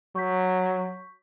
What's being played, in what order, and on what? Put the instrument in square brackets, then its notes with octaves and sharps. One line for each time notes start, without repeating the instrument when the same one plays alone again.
[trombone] F#3 [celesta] C#6 G6 B6